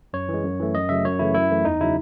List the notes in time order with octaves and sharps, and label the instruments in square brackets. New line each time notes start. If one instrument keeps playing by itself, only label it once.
[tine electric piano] F#2 C#5
E3
G#3
F#2
E3 A3
F#2 D#5
C#3 F#3 A3 E5
F#2 C#5
C#3 E3 A3 E4
F#2 E4
E3 A3
E2 D#4
C#3 F#3 E4